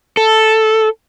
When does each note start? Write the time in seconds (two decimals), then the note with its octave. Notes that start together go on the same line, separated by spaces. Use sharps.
0.17 A4